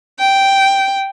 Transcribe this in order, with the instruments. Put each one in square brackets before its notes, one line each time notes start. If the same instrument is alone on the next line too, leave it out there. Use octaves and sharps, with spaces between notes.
[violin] G5